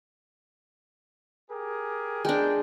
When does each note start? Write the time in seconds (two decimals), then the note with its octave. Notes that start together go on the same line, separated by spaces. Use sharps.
1.50 G4 G#4 A#4
2.25 G#3 D4 A#4 G5